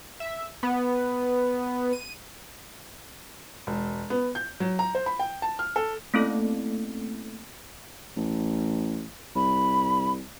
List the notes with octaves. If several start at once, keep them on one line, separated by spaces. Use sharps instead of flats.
E5
B3
D#7
E1
B3
G6
F#3
A#5
C5
B5
G5
A5
F6
A4
A3 A#3 C4 C#4 E4 A4
A1
C2 B5